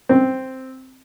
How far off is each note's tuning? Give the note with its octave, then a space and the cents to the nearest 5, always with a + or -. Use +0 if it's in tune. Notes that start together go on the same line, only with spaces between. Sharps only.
C4 +0